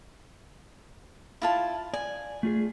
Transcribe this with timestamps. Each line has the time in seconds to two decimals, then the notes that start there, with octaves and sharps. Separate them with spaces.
1.42 E4 F4 A5
1.94 D5 G#5
2.43 A3 F4 G#4